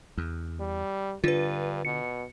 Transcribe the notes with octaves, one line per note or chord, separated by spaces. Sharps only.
E2
G3
G2 D3 F4 B4
B2 C#7